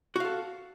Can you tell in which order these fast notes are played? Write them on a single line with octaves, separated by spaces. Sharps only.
F#4 F5 A4